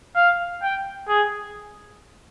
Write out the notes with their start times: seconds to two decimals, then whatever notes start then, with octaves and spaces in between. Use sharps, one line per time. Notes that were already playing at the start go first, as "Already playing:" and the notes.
0.15 F5
0.62 G5
1.08 G#4